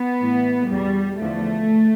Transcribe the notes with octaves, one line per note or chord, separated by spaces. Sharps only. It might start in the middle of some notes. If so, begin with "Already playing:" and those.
Already playing: B3
A2 E3
E2 B2 G3
E2 D3 F3 A3